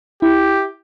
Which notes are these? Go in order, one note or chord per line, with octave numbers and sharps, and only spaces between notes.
E4 G4